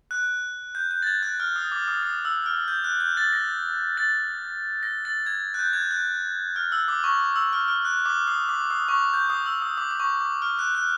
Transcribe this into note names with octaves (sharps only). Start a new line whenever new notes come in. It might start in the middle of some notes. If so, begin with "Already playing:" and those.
F#6
G6
G6
A6
G#6
F#6
F6
D#6
D6
D#6
D#6
E6
F6
G6
F#6
G6
A6
A#6
A6
A#6
A6
G#6
F#6
G6
G#6
G6
F#6
F6
E6
D6
C#6
E6
F6
F6
F#6
D6
D#6
D6
D#6
C#6
D6
G6
D#6
E6
D#6
D6
D6
C#6
D6
F6
F#6
F#6